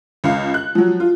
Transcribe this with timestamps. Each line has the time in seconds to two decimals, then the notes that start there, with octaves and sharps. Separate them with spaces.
0.24 C#2 F5
0.54 F#6
0.75 F3 F#3
1.00 F4